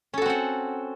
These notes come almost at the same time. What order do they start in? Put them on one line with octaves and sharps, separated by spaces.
C#4 A4 F#4 C4 F#5